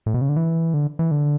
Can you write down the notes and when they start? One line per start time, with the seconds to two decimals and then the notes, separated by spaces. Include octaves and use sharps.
0.06 A2
0.14 B2
0.21 C#3
0.29 D3
0.36 E3
0.74 D3
0.99 E3
1.11 D3